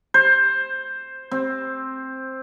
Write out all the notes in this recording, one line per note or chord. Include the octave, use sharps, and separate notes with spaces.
C5
C4